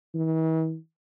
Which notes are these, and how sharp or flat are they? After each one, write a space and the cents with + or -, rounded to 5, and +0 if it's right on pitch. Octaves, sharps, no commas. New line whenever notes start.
E3 -45